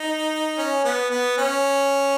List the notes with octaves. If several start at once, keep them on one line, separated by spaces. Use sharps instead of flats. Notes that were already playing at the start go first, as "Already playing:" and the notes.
Already playing: D#4
C#4
B3
B3
C#4